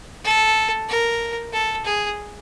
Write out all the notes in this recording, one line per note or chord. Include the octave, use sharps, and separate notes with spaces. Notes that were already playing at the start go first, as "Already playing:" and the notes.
A4
A#4
A4
G#4